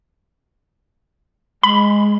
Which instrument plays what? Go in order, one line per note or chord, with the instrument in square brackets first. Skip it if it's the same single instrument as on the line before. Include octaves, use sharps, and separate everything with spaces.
[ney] G#3 [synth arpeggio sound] B5